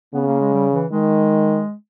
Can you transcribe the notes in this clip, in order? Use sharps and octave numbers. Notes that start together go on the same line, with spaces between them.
C#3 B3
A#3
G#3
G3
E3
D#3 G#3